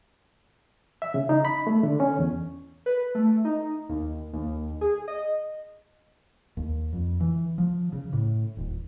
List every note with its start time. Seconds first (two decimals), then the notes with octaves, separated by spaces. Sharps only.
1.02 E5
1.14 C#3
1.29 D#4
1.45 B5
1.67 A3
1.83 D3
2.00 C#4
2.19 E2
2.86 B4
3.15 A3
3.45 D#4
3.89 D#2
4.33 D#2
4.81 G#4
5.08 D#5
6.57 D#2
6.93 F2
7.20 E3
7.58 F3
7.93 C#3
8.13 A2
8.57 D#1